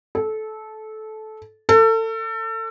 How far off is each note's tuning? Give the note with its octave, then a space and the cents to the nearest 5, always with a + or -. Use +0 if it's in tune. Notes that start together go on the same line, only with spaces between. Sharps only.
A4 -20
A4 +30